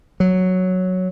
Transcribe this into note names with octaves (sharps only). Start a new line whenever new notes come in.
F#3